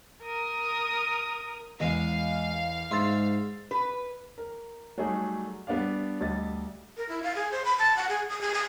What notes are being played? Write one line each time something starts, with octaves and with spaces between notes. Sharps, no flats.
A#4 D#6
E2 G#3 F5
G#2 E5 C6 A6
B4
A#4
F#3 G3 A3 D#4 G#4
G3 B3 D4 D5 F5
D2 G3 D#5 A6
A#4
E4
F5
G#4
C5
B5
A5
F#5
G#4
D#6
G#4
D#6